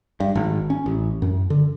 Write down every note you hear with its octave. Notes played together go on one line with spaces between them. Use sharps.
G2
G#1
C#4
A1
F#2
D3